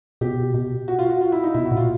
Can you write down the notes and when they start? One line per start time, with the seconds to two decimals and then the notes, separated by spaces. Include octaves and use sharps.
0.21 B2 G4
0.54 B2
0.88 F#4
0.99 F4
1.10 F#4
1.21 F4
1.32 E4
1.43 D#4
1.54 B2 E4
1.66 F#4
1.72 A#2 F4